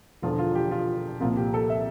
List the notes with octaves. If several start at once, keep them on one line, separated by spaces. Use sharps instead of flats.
E1 E2 D3 F3 F4
F4
G4
F4
C2 A#2 F3 F4
G4
A4
E5